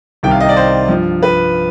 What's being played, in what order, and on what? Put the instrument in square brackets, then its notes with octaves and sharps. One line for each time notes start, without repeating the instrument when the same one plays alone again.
[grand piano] C2 C3 D#3 G5
F5
D#5
D5
C5
G2 F3
B4